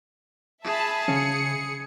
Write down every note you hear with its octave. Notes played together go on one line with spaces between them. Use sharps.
G#4 E5 A5 B5
C#3 C#4 C#7